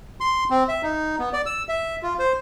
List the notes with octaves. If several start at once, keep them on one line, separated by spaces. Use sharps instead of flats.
C6
C4
E5
D#4
B3
D5
E6
E5
F4
C5